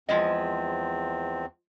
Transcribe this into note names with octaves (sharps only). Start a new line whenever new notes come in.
E2 F3 G#3 C4 D#5